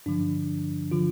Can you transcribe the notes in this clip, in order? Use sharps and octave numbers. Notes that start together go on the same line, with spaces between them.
G2 D3 F3 D4
D3 F3 F4